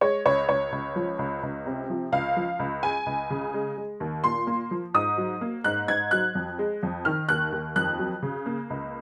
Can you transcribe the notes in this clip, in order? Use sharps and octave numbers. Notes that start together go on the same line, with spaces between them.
G#3 C#5
C#2 C#5
C#2 C#5
C#2
F3
C#2
C#2
C3
F3
C#2 F5
F3
C#2
G#3 G#5
C#2
C#3
G#3
G#3
D#2
A#2 C6
A#3
F3
G#2 D#6
F#3
A#3
G#2 F#6
G#2 G#6
F#3 F#6
F2
G#3
F2
D#3 F6
D#2 F#6
D#2
F2 F#6
F#3
C#3
A#3
C#2